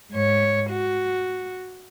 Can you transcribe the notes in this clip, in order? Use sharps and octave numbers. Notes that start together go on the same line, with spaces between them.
G#2 C#5
F#4